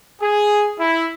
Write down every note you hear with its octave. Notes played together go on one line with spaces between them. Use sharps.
G#4
E4